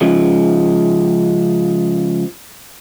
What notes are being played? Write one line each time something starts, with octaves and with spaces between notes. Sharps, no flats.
C#3 F3 G#3